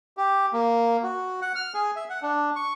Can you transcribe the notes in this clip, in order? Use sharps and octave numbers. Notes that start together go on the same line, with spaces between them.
G4
A#3
F#4
F#5
F6
G#4
E5
F#5
D4
C#6